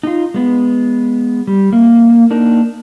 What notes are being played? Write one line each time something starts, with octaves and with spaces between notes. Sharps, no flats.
D#4 F4
G#3 B3
G3
A#3
A#3 D4 D#4 A#4